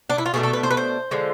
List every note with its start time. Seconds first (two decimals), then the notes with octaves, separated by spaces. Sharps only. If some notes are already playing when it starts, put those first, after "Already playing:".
0.10 D4
0.18 E4
0.26 F4
0.34 B2 A3 D4 G#4
0.43 A4
0.53 B4
0.63 C5
0.70 B4
0.77 C5
1.11 D3 F3 G#3